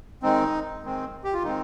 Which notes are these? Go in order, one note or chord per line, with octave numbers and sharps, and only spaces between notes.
D#3 G#3 C4 D#4
D#3 G#3 C4
G4
F4
D#3 G#3 C4 D#4